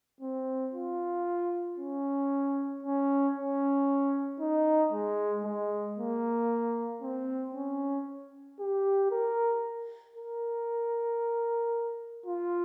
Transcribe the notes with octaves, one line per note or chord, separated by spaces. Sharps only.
C4
F4
C#4
C#4
C#4
D#4
G#3
G#3
A#3
C4
C#4
G4
A#4
A#4
F4